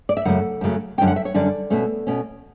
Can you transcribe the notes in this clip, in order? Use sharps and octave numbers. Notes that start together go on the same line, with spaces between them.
D5
E5
F#2 C#3 F#3 A3 F#5
F#2 C#3 F#3 A3
F#2 D3 G3 C#4 G5
F#5
E5
C#5
F#2 D3 G3 C#4 D5
B2 A3 C#4
B2 A3 C#4